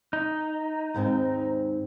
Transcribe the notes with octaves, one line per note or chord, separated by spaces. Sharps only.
D#4
D#2 G#2 C4